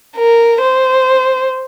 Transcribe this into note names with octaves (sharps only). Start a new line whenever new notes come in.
A#4
C5